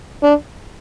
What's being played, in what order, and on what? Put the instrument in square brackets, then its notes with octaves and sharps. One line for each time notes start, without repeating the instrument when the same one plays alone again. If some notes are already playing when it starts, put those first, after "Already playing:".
[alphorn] D4